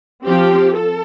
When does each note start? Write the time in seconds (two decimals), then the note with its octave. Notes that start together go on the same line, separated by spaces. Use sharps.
0.24 F3 C4 G4
0.73 A4